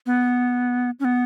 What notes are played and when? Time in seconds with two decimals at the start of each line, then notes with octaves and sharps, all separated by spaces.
0.06 B3
1.00 C#4
1.05 B3